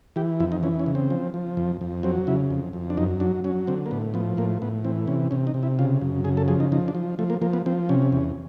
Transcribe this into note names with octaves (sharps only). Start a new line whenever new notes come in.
E3 G4
F2 E4
D#4
E3 C#4
C#4
C#3
C4
F3
F3
F2
F2
F#3 C4
C#3 E4
F2
F2
D4
F#2 D#4
F#3 D4
F#3 C#4
D3 C4
A#3
A2 B3
F3 B3
A2 A#3
A2 B3
E3 C4
C3 C#4
C3 C#4
D#4
C3
E4
C#3 F4
F#2
C#3 G#4
A4
F3 G#4
D#4
F3 D#4
D4
F3
F3 A3
A#3
F3 A#3
B3
F3 C4
C3 C#4
E2